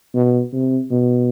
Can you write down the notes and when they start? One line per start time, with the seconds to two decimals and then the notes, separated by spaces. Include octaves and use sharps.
0.14 B2
0.53 C3
0.91 B2